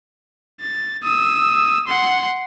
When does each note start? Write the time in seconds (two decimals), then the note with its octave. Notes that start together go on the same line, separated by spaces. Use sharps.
0.61 A6
1.04 D#6 E6
1.88 F#5 C6